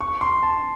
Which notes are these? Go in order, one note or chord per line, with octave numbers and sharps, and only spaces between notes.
C#6
C6
A5